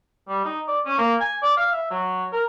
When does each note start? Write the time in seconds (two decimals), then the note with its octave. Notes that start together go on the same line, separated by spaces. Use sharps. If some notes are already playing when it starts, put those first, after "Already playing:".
0.28 G3
0.45 D#4
0.68 D5
0.85 C#4
0.98 A#3
1.20 G#5
1.42 D5
1.57 F5
1.72 E5
1.91 F#3
2.33 A#4